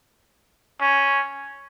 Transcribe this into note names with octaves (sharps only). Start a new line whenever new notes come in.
C#4